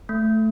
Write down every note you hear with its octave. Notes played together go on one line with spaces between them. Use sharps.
A3